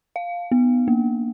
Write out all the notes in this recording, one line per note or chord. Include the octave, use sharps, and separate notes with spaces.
F5
B3
A#3